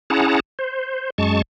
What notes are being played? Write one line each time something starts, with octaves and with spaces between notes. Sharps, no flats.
C#4 E4 G#4 F#5 A5 A#5
C5
F#2 G#3 A5 C#6